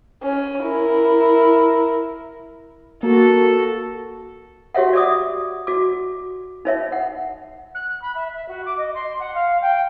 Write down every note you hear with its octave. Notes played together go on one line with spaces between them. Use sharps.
C#4
E4 A#4
A#3 F#4 A4
F#4 G4 C#5 E5 F#5
D5 E5 D6 D#6
F#4 D6
D#4 C#5 E5
F#5
F#6
B5
E5
E5
F#4
D6
D#5
C6
F#5
F5
G5